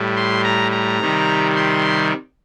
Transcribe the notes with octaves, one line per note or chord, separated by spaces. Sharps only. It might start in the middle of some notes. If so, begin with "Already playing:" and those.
Already playing: A2 G3
C6
A#5
A#5
C3 D#3 G3
C6